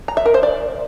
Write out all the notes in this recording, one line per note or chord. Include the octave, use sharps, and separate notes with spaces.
A#5
E5
A#4
C5
D5